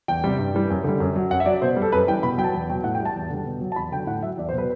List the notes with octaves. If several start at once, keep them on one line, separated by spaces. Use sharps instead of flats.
E2 G5
C3 G3
G2
E3 G3
F#2
D3 G3
F#2
F#3
F#2 F#5
E5
F#3 D5
B2 C5
G3
A4
F#2 B4
E3 G3 G5
B2 B5
F#3 G5
A5
E2
B2 F#3 G5
A2 F#5
G5
G3
A5
E2
D3 G3
B2
F#3
A5
E2 B5
D3 F#3 G5
A2 F#5
F#3 E5
E2 D5
C5
B2 F#3 B4